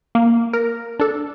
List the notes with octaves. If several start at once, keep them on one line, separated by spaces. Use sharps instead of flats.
A#3
A#4
D4 A4